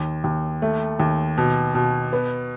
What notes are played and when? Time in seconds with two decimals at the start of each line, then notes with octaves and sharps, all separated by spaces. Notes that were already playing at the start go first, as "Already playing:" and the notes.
Already playing: D#2
0.24 D#2
0.62 A3
1.00 D#2
1.38 B2
1.75 B2
2.13 B3